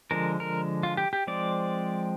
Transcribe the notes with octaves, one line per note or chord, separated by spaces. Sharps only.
D3 F3 G#3 A#4
A#4
F4
G4
G4
F3 G#3 C4 D5